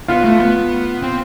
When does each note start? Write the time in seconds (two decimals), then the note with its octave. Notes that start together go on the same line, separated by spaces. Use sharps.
0.08 B3 F4
0.24 A3
0.40 B3
1.03 C4